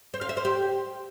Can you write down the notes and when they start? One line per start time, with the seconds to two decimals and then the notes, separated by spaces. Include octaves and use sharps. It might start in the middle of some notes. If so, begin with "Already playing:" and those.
0.14 C5
0.21 F5
0.29 E5
0.37 C5
0.45 G4